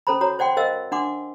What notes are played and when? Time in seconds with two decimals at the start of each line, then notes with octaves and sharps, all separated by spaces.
0.07 C#4 A4 C5 A#5 B5
0.21 F#4 C#5 A#5
0.39 C5 D5 F#5 G5 C6
0.57 A#4 C5 D#5 F5 E6
0.92 D4 F#5 C6 D6